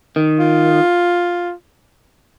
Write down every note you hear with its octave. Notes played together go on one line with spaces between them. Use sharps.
D#3
F4